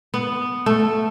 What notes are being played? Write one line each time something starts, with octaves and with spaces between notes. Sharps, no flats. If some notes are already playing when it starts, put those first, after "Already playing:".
B3
A3